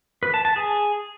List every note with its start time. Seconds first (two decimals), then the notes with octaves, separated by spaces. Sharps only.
0.23 B4
0.34 A5
0.45 A5
0.56 G#4